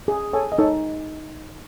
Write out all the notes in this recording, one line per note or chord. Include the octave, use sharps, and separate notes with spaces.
G#4
A4 C#5 G#5
D#5
D#4 A4 C#5